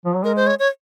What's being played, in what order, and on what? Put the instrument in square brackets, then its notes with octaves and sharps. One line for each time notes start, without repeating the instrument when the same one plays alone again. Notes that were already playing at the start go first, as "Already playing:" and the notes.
[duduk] F3
F#3
[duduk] G#3 [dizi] A#4
[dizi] C5
C#5
C#5